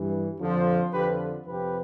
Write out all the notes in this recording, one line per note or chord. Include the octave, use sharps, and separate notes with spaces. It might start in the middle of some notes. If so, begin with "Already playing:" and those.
Already playing: G2 E3
F2 D3 F3
F2 D3 F3 G4 B4
F2 C3 F3 G4 B4